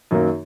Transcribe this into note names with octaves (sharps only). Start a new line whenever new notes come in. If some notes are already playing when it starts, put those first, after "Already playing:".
F#2 D#3 F#3 A#3